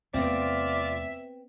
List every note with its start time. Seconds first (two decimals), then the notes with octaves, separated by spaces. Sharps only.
0.14 E2 C3 A3 B3 C4 F4 D5 E5